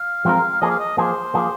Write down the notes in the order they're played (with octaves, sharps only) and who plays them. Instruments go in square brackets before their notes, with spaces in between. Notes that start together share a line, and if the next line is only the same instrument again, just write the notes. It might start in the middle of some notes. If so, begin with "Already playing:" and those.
Already playing: [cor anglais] F5
[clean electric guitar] F3 G#3 C4 F4 A#4
[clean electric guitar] F3 A#3 G#4 [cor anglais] D#5
[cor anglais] F5
D#5
[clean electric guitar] F3 A#3 G#4 [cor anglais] C5
[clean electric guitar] F3 A#3 G#4